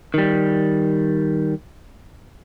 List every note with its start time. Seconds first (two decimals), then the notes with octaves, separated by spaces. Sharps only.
0.14 D#3 G3